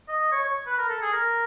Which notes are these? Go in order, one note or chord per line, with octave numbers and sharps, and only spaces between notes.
D#5
C#5
C#5
B4
A#4
A4
G#4
A#4